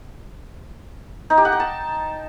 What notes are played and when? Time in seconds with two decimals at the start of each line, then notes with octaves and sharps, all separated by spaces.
1.30 D#4
1.38 G4
1.45 F#5
1.52 G5
1.60 A5